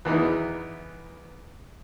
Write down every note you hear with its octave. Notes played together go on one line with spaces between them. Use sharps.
E2 E3 B3 D#4